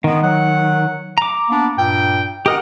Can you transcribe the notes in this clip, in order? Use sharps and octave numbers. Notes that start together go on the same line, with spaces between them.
D#3 G#3 B3
F#3 F#5
A#5 D6
A#3 B3 D4
G2 A#2 G5
G4 A#4 D#5 F#5